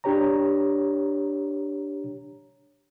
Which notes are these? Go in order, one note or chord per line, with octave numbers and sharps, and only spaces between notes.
D4 G4 C#5 A#5